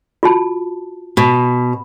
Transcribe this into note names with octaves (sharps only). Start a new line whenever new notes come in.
F4 F#4 A5
B2